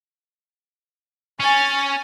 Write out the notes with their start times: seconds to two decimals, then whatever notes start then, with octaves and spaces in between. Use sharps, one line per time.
1.40 C#4 G#5 C#6 A6